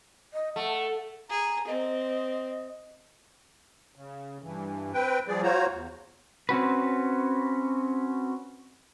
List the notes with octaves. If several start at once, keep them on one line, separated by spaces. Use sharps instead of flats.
D#5
A3 F#5
G#4 A#5
C4 D#5
C#3
G2 E3
C4 B4 G5
F3 G3 G#4 D5
F4 F#4 C5 C#5 A#5
E2
C4 C#4 F#4 B4